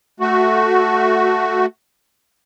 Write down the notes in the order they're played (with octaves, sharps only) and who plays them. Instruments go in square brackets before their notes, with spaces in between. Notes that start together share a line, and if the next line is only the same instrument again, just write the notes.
[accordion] A3 F#4